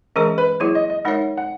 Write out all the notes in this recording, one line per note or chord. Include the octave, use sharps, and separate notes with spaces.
E3 G#3 C#4 G#4 A#4 D#5
B4
F#3 A#3 E4 G#4 C#5
D#5
D#5
G#3 D#4 A#4 C#5 E5 F#5
F#5